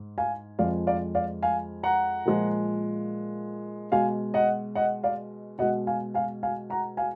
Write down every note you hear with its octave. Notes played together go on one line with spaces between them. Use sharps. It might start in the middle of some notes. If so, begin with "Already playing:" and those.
Already playing: G#2
F5 G#5
F2 F3 G#3 D5 F5
D5 F5
D5 F5
F5 G#5
F#5 A#5
A#2 F3 G#3
B2 G#3 F5 G#5
D#5 F#5
D#5 F#5
D5 F5
B2 G#3 D#5 F#5
F5 G#5
F5 G#5
F5 G#5
F#5 A#5
F5 G#5